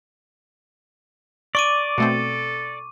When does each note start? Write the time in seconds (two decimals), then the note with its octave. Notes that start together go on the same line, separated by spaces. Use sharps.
1.55 D5 C#6 D6 D#7
1.98 B2 A3 C4 A4